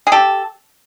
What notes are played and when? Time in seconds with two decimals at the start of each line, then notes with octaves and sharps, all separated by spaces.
0.07 G#4
0.12 G4 A4